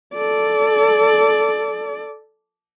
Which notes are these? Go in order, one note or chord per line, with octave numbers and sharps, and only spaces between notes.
A4 D5